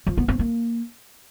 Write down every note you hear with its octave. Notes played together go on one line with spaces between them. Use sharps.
F3
B3
C4
A#3